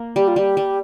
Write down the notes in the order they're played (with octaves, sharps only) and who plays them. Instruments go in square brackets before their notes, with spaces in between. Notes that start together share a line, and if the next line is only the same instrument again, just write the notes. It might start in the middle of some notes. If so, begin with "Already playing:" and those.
Already playing: [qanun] A#3
[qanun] G3 [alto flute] G4
[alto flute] F4
[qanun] G3 [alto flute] G4
[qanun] G3